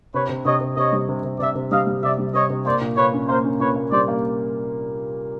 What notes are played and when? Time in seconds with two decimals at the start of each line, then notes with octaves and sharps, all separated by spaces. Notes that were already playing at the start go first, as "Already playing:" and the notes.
0.14 C3 B4 C#5
0.29 C3
0.45 C3 C#5 D#5
0.61 C3
0.77 C3 C#5 D#5
0.93 G3
1.09 C3
1.24 C3
1.39 C3 D5 E5
1.55 C3
1.71 G3 D#5 F5
1.87 G3
2.02 C3 D5 E5
2.18 G3
2.34 C3 C#5 D#5
2.50 C3
2.65 A#3 C5 D5
2.81 A#2
2.97 A#2 B4 C#5
3.13 C#4
3.28 A#3 A#4 C5
3.45 C#4
3.60 A#2 B4 C#5
3.76 A#3
3.92 G3 C5 D5
4.08 A#3